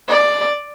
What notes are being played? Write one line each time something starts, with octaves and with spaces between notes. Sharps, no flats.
D5